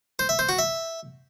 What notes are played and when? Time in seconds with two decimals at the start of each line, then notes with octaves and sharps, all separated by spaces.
0.19 C5
0.29 E5
0.39 C5
0.49 F#4
0.59 E5